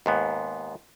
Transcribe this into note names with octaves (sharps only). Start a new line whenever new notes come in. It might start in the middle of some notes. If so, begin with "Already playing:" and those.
D#2 G#2 B3